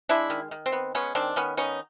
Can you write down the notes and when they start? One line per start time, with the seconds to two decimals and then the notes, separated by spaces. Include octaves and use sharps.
0.09 G#3 D4 E4
0.30 D#3
0.51 D#3
0.66 C4
0.72 B3
0.95 G#3 B3 C#4
1.15 D#3 C4 D4
1.36 D#3 B3 C#4
1.57 B3 C#4 D#4